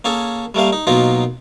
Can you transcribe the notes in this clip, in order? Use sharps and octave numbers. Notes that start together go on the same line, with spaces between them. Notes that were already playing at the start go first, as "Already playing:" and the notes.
A#3 C#4 G#4 A4
G3 A3 A#3 F5
D#4
B2 F#3 A#3 D#4 F4